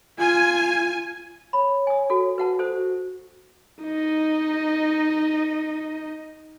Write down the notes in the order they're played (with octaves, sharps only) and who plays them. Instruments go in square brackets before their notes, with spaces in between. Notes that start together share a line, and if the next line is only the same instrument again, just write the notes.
[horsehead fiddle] F4 [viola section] G#5
[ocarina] C#5 [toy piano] B5
[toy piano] G#5 D#6
F#4 A4
[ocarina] F#4 [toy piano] B4 F#5 A5
[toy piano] A4 C5 D#6
[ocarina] F#4
[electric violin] D#4 D#5